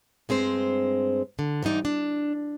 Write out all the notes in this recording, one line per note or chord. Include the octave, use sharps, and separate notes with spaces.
G2 G#3 C4 C5
D3
G#2 E3 G3 D#4 D5
D4